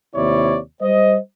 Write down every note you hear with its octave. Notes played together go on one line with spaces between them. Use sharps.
D#2 C3 E4 C#5 D5
G3 C5 D#5